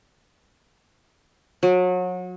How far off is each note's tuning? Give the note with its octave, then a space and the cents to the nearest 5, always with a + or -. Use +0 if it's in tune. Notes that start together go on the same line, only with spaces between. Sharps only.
F#3 -30